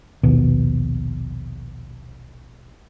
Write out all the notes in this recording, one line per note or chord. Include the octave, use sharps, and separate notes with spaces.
A#1 D#2 B2